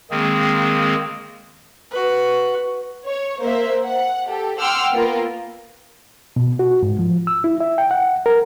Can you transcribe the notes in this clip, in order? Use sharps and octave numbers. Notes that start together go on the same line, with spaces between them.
D#3 G#3 A#3 C4 G#4
F#4 B4
C#5
A#3 C5 E5
F#5
G4 A4
F#5 G5 C6 D6 E6 F6
A#3 B3 F4 A#4
B2
F#4
G#2
F3
E6
E4
E5
G5
F#5
A#4